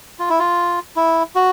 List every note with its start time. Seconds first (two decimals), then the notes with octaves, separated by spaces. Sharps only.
0.19 F4
0.29 E4
0.39 F4
0.96 E4
1.35 F#4